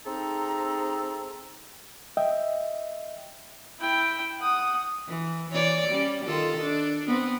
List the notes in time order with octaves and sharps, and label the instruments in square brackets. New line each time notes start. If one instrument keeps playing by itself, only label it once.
[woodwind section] C4 D#4 G#4 A4 E5 A#5
[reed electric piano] D#5 E5 G5
[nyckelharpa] E4 G5
F#5 D#6
[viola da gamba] E3
E3 C#5 D5
G3 C#4
D#3 F4 A4
D4
B3 C4